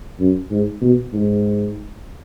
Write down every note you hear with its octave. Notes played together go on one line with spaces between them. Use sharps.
F#2
G#2
B2
G#2